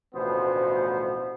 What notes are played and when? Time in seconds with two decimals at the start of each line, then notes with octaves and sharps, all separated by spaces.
0.15 A1 D2 B2 F3 B3 C5